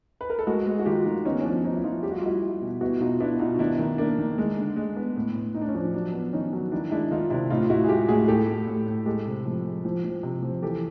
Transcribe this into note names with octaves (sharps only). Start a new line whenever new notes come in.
B4
A#4
A4
G#3 F#4 G#4
G#3
F#4
D#3 F4 G4
D#3
B3 C#4 D#4
C#4
F3 D4
F3 C#4 D#4
E4
F3 D#4 F4
G3 G4
F#4
F4
G3 E4 F#4
G3
B2
B3 E4 F#4
B2 D#4 F4
B3 D4 E4
B2 D#4 F4
D#4
D#3 D4 E4
D#3
A#3 D4
D#3
G#3
D3
G#3
B3
A2
A2
A2 D#4
D4
C#4
F3 D4
F#3 D4
B3
D#3 C#4 D#4
F#3
D#3 D4 E4
G#3 D4 E4
D#3 D#4 F4
C3 D4 E4
A2 D#4 F4
A2 E4 F#4
G#4
G#3 F4 G4
A2 F#4 G#4
A2 G4 A4
A2
A2
A2
G#3 G4 A4
C3
F3
G#3
F3
F3
C3
F3
E3 G4 A4